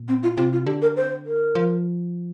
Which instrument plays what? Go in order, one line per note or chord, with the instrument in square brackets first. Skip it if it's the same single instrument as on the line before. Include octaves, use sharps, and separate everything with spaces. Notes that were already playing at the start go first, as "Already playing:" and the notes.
Already playing: [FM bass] A#2
[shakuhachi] C4
F4
[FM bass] C3 [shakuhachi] F4
[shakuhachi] F4
[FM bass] D3 [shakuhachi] G4
[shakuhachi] A#4
C5
A#4
[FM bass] F3